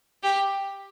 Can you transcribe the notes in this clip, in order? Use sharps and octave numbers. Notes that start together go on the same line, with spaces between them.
G4